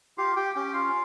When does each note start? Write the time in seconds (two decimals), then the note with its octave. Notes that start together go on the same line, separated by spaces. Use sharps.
0.18 F4 G4 F5
0.36 G4 G5
0.55 C#4 G4 G5
0.73 F4 F5